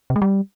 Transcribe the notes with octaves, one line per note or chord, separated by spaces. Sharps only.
C3
G#3
G3